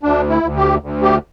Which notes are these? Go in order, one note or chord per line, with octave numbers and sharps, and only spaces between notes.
D2 D4
E4
D2
G4
D2
G4